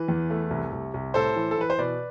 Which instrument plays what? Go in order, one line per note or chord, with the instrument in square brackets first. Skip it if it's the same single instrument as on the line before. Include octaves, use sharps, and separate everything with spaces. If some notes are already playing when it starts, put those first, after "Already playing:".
Already playing: [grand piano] E3 B4
E2
A3
C2
C2
C2
A2 A4 C5
E3
A4
E3 B4
C5
B2 B4 D5